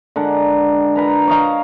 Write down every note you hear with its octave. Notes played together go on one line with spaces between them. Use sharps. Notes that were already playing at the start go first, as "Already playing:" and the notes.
D3 G#3 A#4 F#5
A#4 B4 A#5
C#5 D#5 F5 A#5